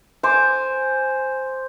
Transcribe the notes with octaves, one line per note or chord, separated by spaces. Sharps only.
C5 G#5 D6